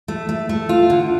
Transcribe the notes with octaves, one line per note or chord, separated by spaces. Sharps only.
A3
A3
A3
F4
D3